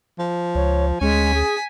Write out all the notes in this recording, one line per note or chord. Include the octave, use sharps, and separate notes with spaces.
F3
C#2 C#5
D2 G#3 C#4 G#5 B6
G#4